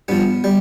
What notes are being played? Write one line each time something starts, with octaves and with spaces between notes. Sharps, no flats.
G2 F3 B3
G3